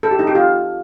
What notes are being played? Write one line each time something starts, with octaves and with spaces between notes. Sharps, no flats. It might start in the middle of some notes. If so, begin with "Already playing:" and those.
A4
G4
D#4
G4
F4